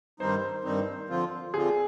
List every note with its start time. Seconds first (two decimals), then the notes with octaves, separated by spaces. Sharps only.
0.20 G2 D#3 G3 C4 D#4 C5
0.64 G2 D#3 G3 C4 D#4
1.09 D3 F3 C4 F4
1.54 D3 F3 C4 F4 G#4